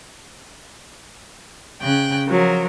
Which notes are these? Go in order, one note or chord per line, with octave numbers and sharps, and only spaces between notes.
C#3 G5 F#6
F3 F#3 A#4